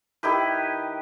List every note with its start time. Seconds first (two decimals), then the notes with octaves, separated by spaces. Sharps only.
0.23 D#3 E4 G4 B4